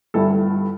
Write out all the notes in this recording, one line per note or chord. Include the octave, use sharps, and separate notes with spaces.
G1 G2 G3 E4 A4